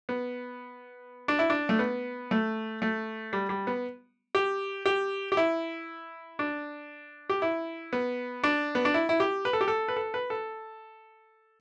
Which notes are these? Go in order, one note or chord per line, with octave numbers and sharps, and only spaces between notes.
B3
D4
E4
D4
A3
B3
A3
A3
G3
G3
B3
G4
G4
G4
E4
D4
G4
E4
B3
D4
B3
D4
E4
E4
G4
B4
A4
G4
A4
B4
A4
B4
A4